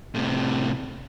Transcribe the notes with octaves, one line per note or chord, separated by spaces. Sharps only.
A2 C3